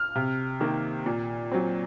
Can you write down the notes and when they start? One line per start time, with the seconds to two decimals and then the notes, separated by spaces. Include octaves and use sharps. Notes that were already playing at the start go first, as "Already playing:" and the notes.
Already playing: F6
0.15 C3
0.61 D#3 A#3
1.06 A#2
1.51 F#3 C4